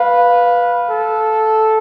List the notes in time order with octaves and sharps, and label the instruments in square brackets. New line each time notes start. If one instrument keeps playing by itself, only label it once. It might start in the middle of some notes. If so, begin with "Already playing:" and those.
Already playing: [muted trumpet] B4 [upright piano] F5
[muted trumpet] A4